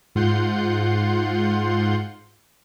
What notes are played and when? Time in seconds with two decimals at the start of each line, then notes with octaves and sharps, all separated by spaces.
0.15 G#2 F4 F#5 C6 G6